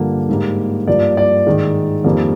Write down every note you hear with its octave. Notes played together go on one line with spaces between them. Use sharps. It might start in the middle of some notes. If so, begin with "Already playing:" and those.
Already playing: G2 D3 F3 A#3
G#2 G3 A#3
G2 F3 A#3 D5
D5
G#2 D#3 G#3
F2 D#3 G3 A#3